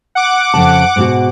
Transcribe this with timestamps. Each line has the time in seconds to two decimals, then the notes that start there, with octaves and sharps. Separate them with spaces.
0.15 F#5 D6
0.54 F2 C#3 A5
0.96 G#2 B2 F#4